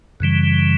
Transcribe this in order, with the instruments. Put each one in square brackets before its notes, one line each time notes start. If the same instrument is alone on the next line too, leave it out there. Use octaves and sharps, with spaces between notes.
[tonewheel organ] F#2 C#3 E3 G3